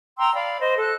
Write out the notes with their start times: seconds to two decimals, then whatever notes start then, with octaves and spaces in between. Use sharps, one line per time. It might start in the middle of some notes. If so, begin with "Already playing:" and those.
0.17 G5 A#5 C6 E6
0.33 D5 F5 B5
0.60 C5 D#5
0.79 A4 F#6